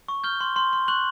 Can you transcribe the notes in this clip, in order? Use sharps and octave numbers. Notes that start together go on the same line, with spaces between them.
C#6
F6 G6 G7
C6
C6
C6
C#6 F#6 F#7